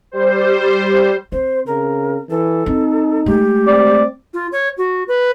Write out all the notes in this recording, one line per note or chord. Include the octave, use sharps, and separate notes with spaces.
G3 C5
C4 C5
C#3 A#4
E3 A4
C4 D#4
G#3 A3 G4
C4 D5
F4
C#5
F#4
B4